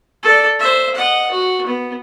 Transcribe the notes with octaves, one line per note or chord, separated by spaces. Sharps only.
A4 D5
C5 E5
D#5 F#5
F#4
B3